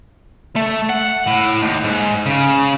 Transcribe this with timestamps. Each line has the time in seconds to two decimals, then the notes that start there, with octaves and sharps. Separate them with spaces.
0.56 A3
0.90 F#5
1.27 A2
1.62 D#2
1.84 G#2
2.26 C#3